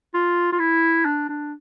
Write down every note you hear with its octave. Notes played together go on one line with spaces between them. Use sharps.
F4
F4
E4
D4
D4